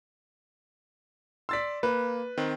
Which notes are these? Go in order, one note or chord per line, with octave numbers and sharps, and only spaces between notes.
D5 C6 E6 A6 B6
A#3 B4
D#3 C4